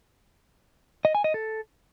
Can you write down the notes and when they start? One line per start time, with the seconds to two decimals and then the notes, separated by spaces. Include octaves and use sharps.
1.05 D#5
1.15 G#5
1.24 D#5
1.34 A4